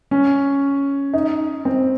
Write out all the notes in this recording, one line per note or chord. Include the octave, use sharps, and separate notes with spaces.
C#4
D#4
C4